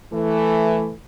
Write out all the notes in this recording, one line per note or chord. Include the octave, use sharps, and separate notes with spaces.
E3 A3